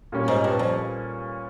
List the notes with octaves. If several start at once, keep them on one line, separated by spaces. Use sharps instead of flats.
A#2 G3 C#4
G#2
G2
F2